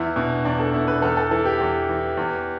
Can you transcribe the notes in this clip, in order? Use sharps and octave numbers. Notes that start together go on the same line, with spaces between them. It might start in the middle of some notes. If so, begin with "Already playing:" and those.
Already playing: E2 E4
B2 D4
E2 D4
A4
B2 E4
B4
E2 A4
A4
E3 A4
G4
E2
E3
E2